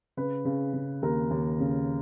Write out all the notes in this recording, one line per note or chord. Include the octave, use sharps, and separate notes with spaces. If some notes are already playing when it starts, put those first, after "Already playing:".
C#3 B4
C#3
C#3
D#2 A#4
D#2
C#3